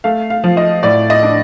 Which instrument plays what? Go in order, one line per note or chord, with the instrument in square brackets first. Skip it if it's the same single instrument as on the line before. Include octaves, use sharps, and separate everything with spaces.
[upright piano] A3 F5
F5
F3
D#5
A2 D5
D#5
D4